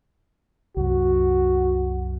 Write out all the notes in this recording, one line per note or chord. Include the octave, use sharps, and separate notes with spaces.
C2 F#2 F#4